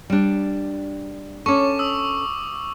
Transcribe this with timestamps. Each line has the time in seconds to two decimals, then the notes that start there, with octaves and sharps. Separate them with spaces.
0.10 G3 D4
1.46 C#4 A4 C#6 D6
1.79 D#6 E6